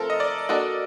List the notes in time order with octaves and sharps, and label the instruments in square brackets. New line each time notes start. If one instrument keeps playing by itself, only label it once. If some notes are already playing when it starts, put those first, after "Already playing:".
Already playing: [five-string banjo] F3 A3 C4 [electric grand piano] A4 A#4
[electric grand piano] D#5
D5
[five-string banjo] A#3 D4 F#4 A4 [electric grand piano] D#5